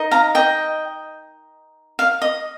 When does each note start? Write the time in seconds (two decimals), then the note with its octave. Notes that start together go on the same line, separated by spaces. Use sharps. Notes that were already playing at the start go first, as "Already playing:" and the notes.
Already playing: D#4 A#4 D#5
0.11 F5 A#5
0.35 D#5 G5
1.99 F5
2.22 D#5